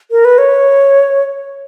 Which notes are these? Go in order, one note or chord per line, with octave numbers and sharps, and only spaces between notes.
A#4
B4
C#5